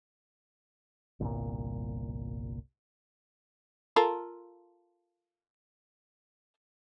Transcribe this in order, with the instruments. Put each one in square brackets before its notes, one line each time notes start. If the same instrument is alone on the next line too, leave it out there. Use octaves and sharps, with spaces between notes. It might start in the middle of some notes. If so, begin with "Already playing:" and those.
[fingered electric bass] G1 C2 A#2
[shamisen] F4 A4 A#4